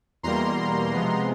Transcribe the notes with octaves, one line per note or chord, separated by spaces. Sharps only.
E2 B2 G3 A#3 A#5 C6
C3 F3 G#3 B3